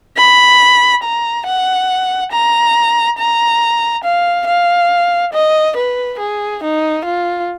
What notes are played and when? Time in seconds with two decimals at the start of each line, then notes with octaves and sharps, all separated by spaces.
0.17 B5
1.03 A#5
1.46 F#5
2.32 A#5
3.18 A#5
4.04 F5
4.47 F5
5.33 D#5
5.76 B4
6.19 G#4
6.63 D#4
7.05 F4